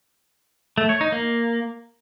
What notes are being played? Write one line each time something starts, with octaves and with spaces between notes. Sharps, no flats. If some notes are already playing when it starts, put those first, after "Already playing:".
A3
C#5
D#4
A#3